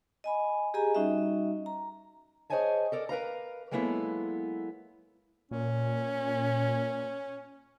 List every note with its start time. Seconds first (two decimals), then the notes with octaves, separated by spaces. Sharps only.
0.24 D#5 G#5 B5
0.74 G4 G#4 D#5 G#5 A#5
0.95 G3 C#4 D#4 F#4 D#5 E5
1.66 A#5
2.50 G#4 C5 C#5 D#5 G#5 A5
2.92 A4 A#4 D5
3.09 A#4 B4 F5 A#5
3.71 F#3 G#3 A#3 B3 E4 A4
5.51 A#2 C#4